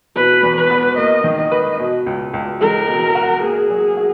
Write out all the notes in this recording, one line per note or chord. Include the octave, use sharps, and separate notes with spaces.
B2 B4
E2
B4
B3
A#3 D#5
D#3
D#5
B4
B2
C#2
C#2
G#3 A#4
B2
F#4
A#3 G#4
F#3
F#4